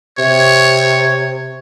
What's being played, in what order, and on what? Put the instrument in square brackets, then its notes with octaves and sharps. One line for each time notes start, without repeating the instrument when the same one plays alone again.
[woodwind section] C3 [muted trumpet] C#5